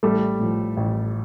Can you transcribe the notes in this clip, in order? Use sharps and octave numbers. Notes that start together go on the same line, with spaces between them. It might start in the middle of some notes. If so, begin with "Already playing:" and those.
A1 G3 A3
A2 F3
A1